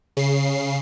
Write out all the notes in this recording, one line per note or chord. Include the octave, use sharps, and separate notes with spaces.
C#3 C7